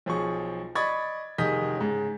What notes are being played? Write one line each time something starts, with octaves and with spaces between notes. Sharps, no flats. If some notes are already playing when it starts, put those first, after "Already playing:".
B1 F3 G#4 C#6
D5 D#5 B5 C#6 G#6 A6
F1 D#3 G#4 D#5 G6 B6
G#2 C#3